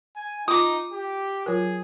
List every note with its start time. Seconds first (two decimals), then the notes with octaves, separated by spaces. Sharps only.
0.16 G#5
0.48 D#4 F4 D6 D#6
0.92 G4
1.46 F#3 F4 G#4 A#4